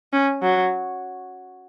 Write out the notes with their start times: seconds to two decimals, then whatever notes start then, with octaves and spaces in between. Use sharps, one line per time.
0.13 C#4
0.42 F#3